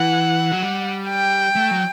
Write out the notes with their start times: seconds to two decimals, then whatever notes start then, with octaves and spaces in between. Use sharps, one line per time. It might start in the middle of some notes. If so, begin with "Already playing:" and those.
Already playing: E3 F#5
0.52 F#3
0.62 G3
1.09 G5
1.56 A3
1.71 F#3